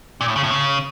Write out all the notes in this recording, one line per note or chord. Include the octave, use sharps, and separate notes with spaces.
A#2
A2
C#3
A2
C#3